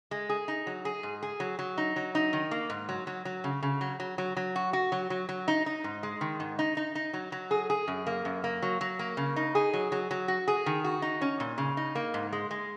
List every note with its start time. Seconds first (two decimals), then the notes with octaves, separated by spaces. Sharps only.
0.11 G#3
0.29 G#4
0.48 D#4
0.67 F#3
0.85 G#4
1.03 G#2
1.23 G#4
1.40 F#3
1.59 F#3
1.78 D#4
1.96 F#3
2.15 D#4
2.33 D#3
2.51 A#3
2.70 G#2
2.89 F#3
3.07 F#3
3.25 F#3
3.44 C#3
3.63 C#3
3.81 F#3
4.00 F#3
4.18 F#3
4.37 F#3
4.56 F#4
4.73 F#4
4.92 F#3
5.10 F#3
5.29 F#3
5.48 D#4
5.66 D#4
5.84 G#2
6.03 G#3
6.21 D#3
6.40 G#2
6.59 D#4
6.77 D#4
6.95 D#4
7.14 F#3
7.32 F#3
7.51 G#4
7.70 G#4
7.88 F#2
8.07 A#3
8.25 F#2
8.44 A#3
8.62 F#3
8.81 F#3
8.99 A#3
9.17 C#3
9.36 D#4
9.55 G#4
9.73 F#3
9.92 F#3
10.11 F#3
10.28 F#4
10.48 G#4
10.66 D#3
10.84 F#4
11.02 D#4
11.21 C#4
11.40 A#2
11.58 C#3
11.77 D#4
11.95 A#3
12.14 G#2
12.32 G#3
12.51 G#3